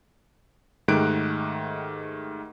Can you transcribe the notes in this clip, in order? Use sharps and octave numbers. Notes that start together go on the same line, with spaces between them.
G#2 D#3 A3 G4 F#6 D7